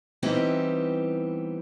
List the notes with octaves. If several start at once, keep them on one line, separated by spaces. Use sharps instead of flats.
E3 G3 B3 C4 D#4 G4